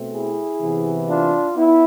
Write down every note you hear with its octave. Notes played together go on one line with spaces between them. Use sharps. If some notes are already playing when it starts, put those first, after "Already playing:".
Already playing: B2 A3 C4
E4 G#4
C3 E3 B3
D4 F4
B3 E4